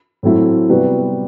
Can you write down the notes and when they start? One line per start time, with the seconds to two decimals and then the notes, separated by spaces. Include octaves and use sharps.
0.23 A2 F#3 A3 C4 E4
0.69 C3 G3 B3 F#4 B4